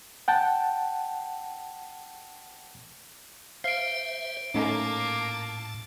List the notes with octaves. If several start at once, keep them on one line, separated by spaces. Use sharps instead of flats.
F#5 G5 A5
C5 E5 F5 C7 D7
A2 A3 A#3 C#4 D#4 A5 D6